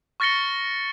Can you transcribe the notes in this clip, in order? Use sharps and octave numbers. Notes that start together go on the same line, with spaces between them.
C#6 F6 A6 A#6 C#7 G7